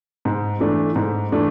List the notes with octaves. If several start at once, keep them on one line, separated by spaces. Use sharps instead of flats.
G#2
E3 A3 D4
G#2
E3 A3 D4